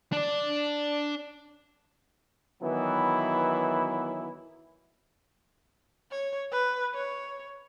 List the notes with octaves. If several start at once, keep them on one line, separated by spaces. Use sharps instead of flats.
D4 D5
D#3 E3 F#3 B3 E4
C#5
B4
C#5